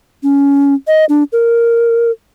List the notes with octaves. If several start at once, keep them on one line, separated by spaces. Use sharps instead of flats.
C#4
D#5
D4
A#4